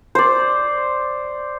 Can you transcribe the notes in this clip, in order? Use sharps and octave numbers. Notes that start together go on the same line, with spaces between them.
C5 D5